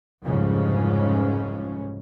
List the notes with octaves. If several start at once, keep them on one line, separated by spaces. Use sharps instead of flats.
F1 C2 G#2 C#3 F3 C#4